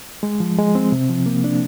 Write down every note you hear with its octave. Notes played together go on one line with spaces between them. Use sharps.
G#3
F3
G#3
C4
C3
F3
A#3
D4